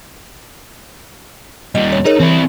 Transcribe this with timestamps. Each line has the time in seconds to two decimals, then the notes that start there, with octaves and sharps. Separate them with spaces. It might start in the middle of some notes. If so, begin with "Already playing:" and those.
1.75 D#2 G3 D#5
1.92 C#5
2.06 D#4 G#4 A#4 C#5
2.20 E3 C4 E4